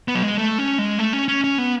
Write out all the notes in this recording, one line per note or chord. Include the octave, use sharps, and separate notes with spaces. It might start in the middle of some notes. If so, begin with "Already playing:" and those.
B3
F#3
G#3
A3
C#4
G#3
A3
C#4
C#4
C#4
B3